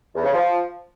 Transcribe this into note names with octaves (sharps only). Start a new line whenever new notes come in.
E2
C#3
F3